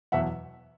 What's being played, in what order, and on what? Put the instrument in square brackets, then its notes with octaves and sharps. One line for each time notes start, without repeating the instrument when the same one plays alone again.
[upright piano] E2 B2 F#3 E5 F#5